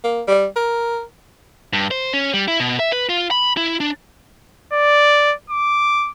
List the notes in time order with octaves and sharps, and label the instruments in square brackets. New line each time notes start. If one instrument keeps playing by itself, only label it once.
[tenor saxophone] A#3
G3
A#4
[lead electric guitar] G2
C5
C#4
G3
E4
B2
E5
B4
F4
B5
E4
D4
[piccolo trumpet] D5
D6